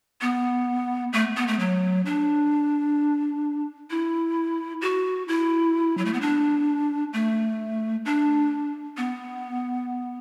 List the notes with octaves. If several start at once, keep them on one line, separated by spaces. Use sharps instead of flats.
B3
A3
B3
A3
F#3
D4
E4
F#4
E4
F#3
A3
B3
D4
A3
D4
B3